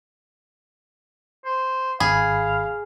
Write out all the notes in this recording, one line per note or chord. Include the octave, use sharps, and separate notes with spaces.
C5
G#1 G#4 F5 B5